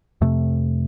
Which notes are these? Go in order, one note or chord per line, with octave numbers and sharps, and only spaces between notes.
F2 C3 A3